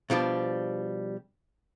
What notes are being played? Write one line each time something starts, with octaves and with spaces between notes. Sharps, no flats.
B2 F3 G3 D4